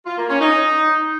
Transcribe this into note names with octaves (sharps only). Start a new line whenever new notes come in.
F4
A#3
C#4
D#4